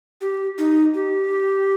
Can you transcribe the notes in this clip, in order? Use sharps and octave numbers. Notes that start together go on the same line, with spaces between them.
G4
D#4
G4